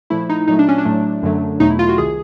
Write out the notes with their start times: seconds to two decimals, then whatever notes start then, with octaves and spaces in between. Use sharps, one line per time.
0.10 A#2 F3 A3 E4
0.29 D#4
0.48 A#2 F#3 A3 D#4
0.59 D4
0.68 C#4
0.78 D4
0.85 A2 F#3 A3
1.23 F#2 D3 F#3 A3
1.60 E2 B2 F#3 A3 D#4
1.70 E4
1.79 F4
1.89 F#4
1.98 C2 C3 D#3 G#4